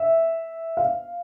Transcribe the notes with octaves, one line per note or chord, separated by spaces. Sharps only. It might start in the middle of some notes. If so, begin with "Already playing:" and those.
Already playing: E5
F5